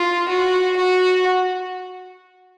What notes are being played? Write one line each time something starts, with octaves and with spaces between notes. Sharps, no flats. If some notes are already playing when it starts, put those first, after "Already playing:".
Already playing: F4
F#4
F#4